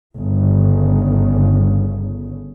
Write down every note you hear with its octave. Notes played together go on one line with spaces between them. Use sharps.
G1 C#3